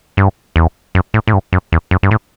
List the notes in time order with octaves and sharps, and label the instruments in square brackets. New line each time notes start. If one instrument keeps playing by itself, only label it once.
[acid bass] G2
E2
F#2
A2
A2
G2
F#2
E2
F#2
G2
A2